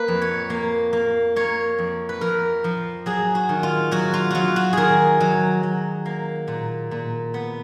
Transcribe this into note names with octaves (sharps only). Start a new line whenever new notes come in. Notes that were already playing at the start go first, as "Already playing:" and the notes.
Already playing: A#3 B4
F2
C#5
A#3
A#3
A#3 C#5
F2
B4
F2 A#4
F3
F#3 G#4
F#4
D#3
F4
F#3 F#4
F4
F#3 F4 F#4
F#4
D#3 G#4 A#4
F#3
F#3
A#3
A#2
A#2
B3